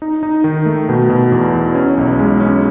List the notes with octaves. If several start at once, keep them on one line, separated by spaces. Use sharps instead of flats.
D#4
D#4
D#3
A3
B2
B2
E2
E2
C#4
B1
G#3
C#4